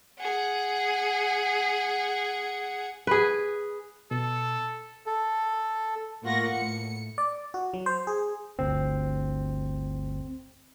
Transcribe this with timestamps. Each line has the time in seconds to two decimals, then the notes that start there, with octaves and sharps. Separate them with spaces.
0.20 G#4 F#5
3.07 G#4 B4
4.11 B2 A4
5.06 A4
6.23 A2 A#3 F4 F#5 C#6 A#6
6.53 A2 C#7
7.18 D5
7.54 F#4
7.74 F#3
7.86 C5
8.07 G#4
8.59 G1 D2 C4